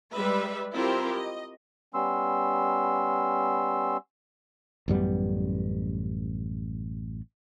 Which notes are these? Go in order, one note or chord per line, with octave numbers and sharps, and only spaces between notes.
G3 G#3 B4 E5 B5
C4 E4 F4 G4 A#4 C5
D#5
G3 B3 C#4 C6 E6
A1 F#2 G3 B3